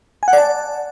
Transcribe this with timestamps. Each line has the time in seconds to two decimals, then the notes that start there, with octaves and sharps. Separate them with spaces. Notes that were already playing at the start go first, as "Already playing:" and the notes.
0.23 G#5
0.28 F#5
0.33 D5
0.38 A5